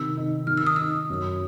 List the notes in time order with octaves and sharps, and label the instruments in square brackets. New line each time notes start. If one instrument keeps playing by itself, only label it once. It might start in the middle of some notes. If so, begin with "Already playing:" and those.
Already playing: [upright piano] C3 D#3 [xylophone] E6
[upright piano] D#4
[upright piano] D#3 [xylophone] F6
[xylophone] E6
D#6
[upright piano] D#4 [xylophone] E6
[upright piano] F#2